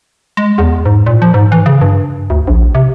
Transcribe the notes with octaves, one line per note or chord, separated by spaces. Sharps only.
G#3
E2
G#2
A#2
F3
G#2
E3
C#3
G2
D2
A#1
C3